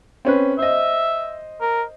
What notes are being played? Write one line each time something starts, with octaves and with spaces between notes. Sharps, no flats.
C4 C#4 B4
C5 D#5 E5
A#4